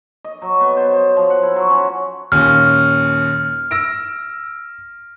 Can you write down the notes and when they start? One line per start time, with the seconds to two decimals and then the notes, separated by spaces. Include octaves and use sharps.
0.25 D#5
0.42 F#3
0.61 B3
0.77 C5
0.94 C5
1.17 F3
1.30 F#5
1.43 E4
1.56 F#3
1.70 C#4
2.32 D#2 A#2 C#4 F6
3.71 E6 A#6 D7